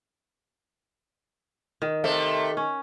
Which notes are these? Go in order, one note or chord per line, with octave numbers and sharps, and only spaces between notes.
D#3
C3 A3
C#4